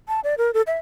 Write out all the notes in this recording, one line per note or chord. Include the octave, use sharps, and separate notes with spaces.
A5
D5
A#4
A4
E5